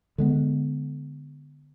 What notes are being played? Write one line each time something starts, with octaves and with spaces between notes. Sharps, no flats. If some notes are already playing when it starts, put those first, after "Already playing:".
D3 G#3 B3